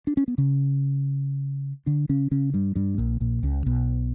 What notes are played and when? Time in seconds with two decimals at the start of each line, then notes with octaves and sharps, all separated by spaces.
0.07 D4
0.17 C#4
0.28 B3
0.38 C#3 C#4
1.86 D3 D4
2.09 C#3 C#4
2.31 C#3 C#4
2.54 G2 G3
2.75 G2 G3
2.98 A#1 A#2
3.20 A#1 A#2
3.43 C#2 C#3
3.66 B1 B2